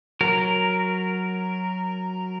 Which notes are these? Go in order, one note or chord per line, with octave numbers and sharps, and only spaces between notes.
F#3 A#4